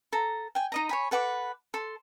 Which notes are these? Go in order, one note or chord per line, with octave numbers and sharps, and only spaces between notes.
A4 A#5
G5 G#5
D#4 D#5 A#5
C#5 G#5 B5
A4 B4 F#5 D6
A4 C6